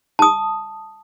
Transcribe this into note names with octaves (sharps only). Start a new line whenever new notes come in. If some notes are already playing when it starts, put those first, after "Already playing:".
A5 D#6